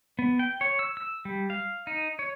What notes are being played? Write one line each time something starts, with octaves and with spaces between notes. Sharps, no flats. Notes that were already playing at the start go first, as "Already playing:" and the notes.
B3
G5
C#5
E6
E6
G3
F5
D#4
C#5